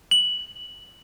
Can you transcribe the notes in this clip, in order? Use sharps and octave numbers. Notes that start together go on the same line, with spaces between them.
F#7